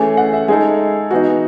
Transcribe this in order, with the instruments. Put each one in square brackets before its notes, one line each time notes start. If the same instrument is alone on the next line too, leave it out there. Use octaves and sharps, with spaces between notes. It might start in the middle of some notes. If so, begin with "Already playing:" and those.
Already playing: [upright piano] E3 A3 C#4 [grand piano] G#4
[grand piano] F#5
E5
[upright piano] G#3 D#4 A4 [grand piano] G#4
[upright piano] E3 B3 D#4 [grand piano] F#4